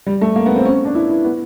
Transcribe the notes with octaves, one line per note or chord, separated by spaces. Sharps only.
G3
A3
A#3
B3
C4
C#4
D4
E4
E4
B3